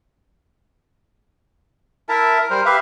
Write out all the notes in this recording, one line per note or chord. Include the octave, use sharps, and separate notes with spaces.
E4 A#4 E5 A5
A#4
G3 A#4 C5
G4 B4 E5 F5